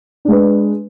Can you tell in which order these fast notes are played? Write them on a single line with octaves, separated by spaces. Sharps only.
D4 G#3 B4